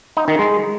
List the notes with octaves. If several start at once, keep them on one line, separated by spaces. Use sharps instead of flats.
D#4
D#3
G#3